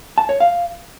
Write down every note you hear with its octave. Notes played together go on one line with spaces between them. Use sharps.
A5
C#5
F5